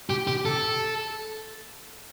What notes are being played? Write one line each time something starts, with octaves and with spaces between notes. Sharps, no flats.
G4
G4
A4